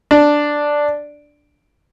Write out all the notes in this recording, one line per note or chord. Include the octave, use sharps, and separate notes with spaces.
D4